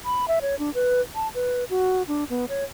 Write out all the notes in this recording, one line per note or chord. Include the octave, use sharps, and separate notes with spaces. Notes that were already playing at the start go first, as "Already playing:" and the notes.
B5
E5
C#5
D4
B4
A5
B4
F#4
D4
B3
C#5